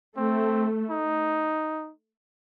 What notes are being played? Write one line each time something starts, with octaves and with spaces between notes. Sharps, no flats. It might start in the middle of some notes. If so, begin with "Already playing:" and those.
A3 C4
D#4